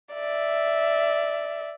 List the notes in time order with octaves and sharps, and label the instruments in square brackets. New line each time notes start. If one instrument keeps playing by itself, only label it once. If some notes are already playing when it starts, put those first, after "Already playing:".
[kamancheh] D5 E5